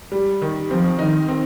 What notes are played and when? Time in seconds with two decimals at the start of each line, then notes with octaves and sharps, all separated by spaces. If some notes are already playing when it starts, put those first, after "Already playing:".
0.12 G3
0.42 D#3
0.70 F3 C4
0.99 D#3 D#4
1.28 C4